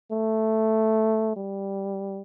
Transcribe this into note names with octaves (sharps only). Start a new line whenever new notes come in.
A3
G3